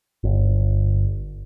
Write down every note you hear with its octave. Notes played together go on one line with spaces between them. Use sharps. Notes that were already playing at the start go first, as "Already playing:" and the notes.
G1